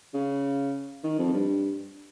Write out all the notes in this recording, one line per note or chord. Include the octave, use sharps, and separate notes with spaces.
C#3
D#3
F2
G2